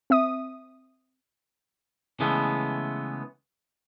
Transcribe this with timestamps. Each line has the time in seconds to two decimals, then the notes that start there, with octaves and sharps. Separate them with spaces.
0.10 C4 E5 D#6
2.20 C#3 E3 G#3 A3 B3